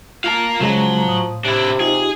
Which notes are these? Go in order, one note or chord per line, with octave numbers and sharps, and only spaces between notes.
F4 A#4 F5 A5
C#3 F3 F#3 G#3 A#5
A2 D#6
C3 D4 E4
D#4 F4 G4 G#4